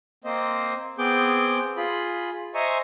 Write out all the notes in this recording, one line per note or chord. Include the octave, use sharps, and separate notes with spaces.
A#3 C4 C5 D#5
B3 C4 G#4 D6 G6
F4 G#4 B5
C5 D#5 E5 G#5 A#5 C#6